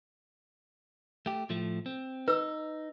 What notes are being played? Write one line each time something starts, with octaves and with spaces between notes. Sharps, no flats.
A3 G4
A2 F3 A3
C4
D#4 B4 E6